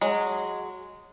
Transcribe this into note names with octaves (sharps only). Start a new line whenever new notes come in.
F#3 G#3